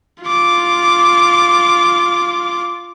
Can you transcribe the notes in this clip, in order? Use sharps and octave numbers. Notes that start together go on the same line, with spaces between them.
F4 D6